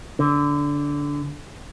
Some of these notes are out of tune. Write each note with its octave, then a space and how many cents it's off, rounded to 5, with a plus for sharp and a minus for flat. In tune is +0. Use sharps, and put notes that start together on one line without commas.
D3 -15